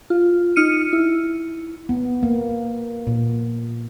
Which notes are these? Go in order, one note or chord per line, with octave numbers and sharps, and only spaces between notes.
F4
D#4 F6 C#7 D#7
E4
B3
A#3
A#2